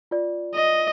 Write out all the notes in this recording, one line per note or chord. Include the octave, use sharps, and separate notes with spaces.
F4 D5
D#5